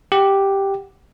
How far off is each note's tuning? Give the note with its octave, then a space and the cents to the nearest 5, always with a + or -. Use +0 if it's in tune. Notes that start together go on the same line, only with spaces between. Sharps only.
G4 +0 F#5 +0